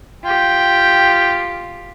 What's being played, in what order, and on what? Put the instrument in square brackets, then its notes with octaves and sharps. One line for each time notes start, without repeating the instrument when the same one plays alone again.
[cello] F4 G4 [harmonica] G5